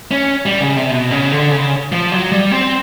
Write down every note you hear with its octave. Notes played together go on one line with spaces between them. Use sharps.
C#4
G3
C#3
C3
B2
C#3
D3
C#3
F3
F#3
G3
C4